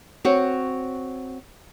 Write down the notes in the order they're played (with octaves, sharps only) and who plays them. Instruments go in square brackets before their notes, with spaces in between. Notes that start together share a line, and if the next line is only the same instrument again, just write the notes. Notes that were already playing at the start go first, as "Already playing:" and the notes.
[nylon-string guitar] C4 F#4 C#5